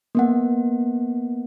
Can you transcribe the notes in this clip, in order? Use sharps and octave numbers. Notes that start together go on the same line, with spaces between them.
A#3 B3 F#5